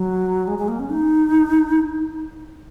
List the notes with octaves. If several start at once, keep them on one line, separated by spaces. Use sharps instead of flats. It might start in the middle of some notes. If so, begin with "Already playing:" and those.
Already playing: F#3
G#3
G#3
A#3
C#4
D#4